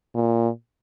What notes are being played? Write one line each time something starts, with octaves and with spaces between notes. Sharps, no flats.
A#2